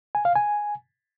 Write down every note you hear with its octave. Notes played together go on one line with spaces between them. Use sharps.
G#5
F5
G#5